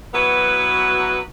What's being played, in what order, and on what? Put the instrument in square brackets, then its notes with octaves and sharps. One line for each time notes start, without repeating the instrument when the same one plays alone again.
[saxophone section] F#3 B3 E4 F#4 B4